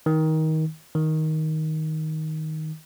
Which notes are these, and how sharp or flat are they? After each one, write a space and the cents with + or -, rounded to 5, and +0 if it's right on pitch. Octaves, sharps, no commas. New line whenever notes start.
D#3 +20
D#3 +10